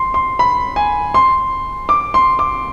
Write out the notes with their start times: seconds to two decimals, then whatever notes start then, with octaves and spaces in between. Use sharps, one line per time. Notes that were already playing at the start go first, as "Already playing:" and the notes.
Already playing: C6
0.14 C6
0.39 B5
0.76 G#5
1.14 C6
1.89 D6
2.14 C6
2.39 D6